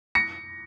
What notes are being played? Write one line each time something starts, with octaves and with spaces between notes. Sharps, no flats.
A#6 C#7